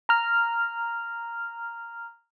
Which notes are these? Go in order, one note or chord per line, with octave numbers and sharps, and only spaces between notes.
A#5 F6